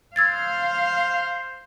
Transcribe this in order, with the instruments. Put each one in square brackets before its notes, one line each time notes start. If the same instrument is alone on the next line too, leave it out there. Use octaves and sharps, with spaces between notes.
[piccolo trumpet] C5 [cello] F5 [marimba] E6 G#6 A6